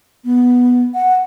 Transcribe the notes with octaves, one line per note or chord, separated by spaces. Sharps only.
B3
F#5